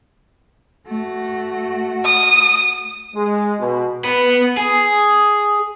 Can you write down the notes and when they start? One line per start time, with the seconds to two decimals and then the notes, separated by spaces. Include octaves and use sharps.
0.87 A3 F#4
2.05 D#6
3.15 G#3
3.60 B2
4.04 B3 B4
4.57 G#4